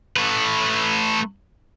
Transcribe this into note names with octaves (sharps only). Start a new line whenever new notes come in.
A3 B4